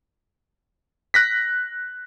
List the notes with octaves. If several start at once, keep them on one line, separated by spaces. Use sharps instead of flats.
F#6 A#6 B6